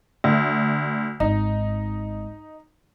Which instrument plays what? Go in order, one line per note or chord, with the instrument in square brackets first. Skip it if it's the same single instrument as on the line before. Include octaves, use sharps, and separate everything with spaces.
[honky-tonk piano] D2
[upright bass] G#1 [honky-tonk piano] D#4